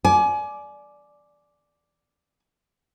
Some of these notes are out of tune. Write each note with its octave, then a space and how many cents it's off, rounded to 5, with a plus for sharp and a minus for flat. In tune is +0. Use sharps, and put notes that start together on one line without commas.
D5 +0 G#5 +30